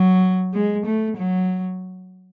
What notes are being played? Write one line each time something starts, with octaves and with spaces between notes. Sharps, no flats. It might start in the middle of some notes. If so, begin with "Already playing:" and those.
Already playing: F#3
G#3
A3
F#3